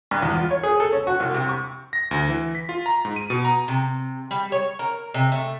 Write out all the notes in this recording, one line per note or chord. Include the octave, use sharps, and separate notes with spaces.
G2
E2
F4
C#5
G#4
A4
C#4
F#4
C2
C3
C#6
A#6
D2
E3
B6
F4
A#5
G#2
D#7
B2
A#5
C3
G3
C#5
A#4
C3
A3